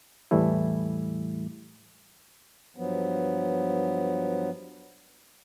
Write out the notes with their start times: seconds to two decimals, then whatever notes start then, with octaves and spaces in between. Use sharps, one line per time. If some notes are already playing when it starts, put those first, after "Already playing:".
0.31 E2 A2 E3 G3 A3 E4
2.77 G2 F3 F#3 B3